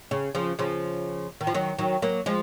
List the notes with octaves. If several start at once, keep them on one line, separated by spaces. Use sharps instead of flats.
C#3
C#3 F3
C#3 F3
D#3
F3
D#3 F#3
D#3 F#3
F#3 A#3
F3 G#3